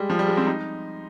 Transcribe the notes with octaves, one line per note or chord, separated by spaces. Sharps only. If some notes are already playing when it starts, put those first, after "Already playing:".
Already playing: G3 G#3
F3
G3
G#3
C4
D#4